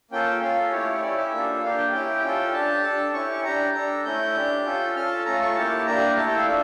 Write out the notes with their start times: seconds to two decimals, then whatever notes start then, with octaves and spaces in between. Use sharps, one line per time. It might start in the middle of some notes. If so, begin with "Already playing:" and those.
0.11 A#3 C#4 F4 A4 G5
0.41 C#4 F4 A4 F5
0.71 A3 E4 G4 C#5
0.97 C#5
1.02 C#4 E4 G4 D5
1.18 E5
1.32 A#3 D4 F4 A4
1.62 A#3 D4 G4 F5
1.78 G5
1.92 C#4 E4 G4 G5
2.24 C#4 F4 A4
2.53 D4 G4 A5
2.83 D4 A4
3.13 C#4 E4 G4 C#6
3.44 D4 G4 A#5
3.74 D4 A4 A#5
4.05 A3 C#4 E4 G6
4.35 D4 G4
4.65 C#4 F4 A4
4.96 C#4 F4 A4 F6
5.10 A5
5.25 A3 C#4 F4 A4 A#5
5.42 C#6
5.56 A#3 E4 G4 A5
5.86 A#3 D4 G4 A#5
6.16 A3 E4 A4 A5
6.27 G5
6.37 F5
6.47 D4 F4 E5